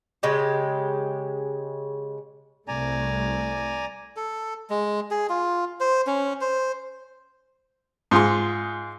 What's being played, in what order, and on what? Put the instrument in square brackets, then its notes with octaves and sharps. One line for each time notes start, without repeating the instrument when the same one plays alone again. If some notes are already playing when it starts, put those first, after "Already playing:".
[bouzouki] C#3 G#3 G4
[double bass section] C2 A3 [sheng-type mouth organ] D5 G#5 A#5
[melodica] A4
G#3
G#4
F4
C5
C#4
C5
[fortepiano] G#2 F4 G#4 C6